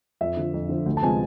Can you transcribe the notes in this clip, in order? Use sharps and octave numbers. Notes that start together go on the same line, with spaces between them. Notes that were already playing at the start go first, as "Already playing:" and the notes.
F2 E5
D3 F3
F2
D3 F3
D2
A5
C3 F3 G#3 B3 G#5